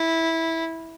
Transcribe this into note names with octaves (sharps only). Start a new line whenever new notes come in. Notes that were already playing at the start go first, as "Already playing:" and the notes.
Already playing: E4